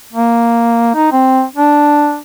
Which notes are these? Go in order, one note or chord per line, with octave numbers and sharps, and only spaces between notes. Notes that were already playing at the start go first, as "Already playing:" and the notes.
A#3
D#4
C4
D4